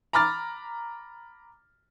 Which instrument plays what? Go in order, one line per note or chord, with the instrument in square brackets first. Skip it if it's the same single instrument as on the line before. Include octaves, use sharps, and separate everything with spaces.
[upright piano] A#5 B5 D6 F6 A6